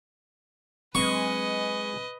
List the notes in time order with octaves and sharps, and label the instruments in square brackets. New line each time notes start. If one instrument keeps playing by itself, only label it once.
[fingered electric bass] F#3 C4 D4 [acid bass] G#3 [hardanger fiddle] B4 D#5 [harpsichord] C#6